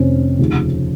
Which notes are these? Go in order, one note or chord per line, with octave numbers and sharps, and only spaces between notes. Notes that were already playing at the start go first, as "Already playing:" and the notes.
Already playing: F1 F2 C3 D#3 C4 C#4
F1 D#2 C#3 F3